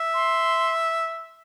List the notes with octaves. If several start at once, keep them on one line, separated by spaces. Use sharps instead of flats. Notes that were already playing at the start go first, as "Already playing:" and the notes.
Already playing: E5
C6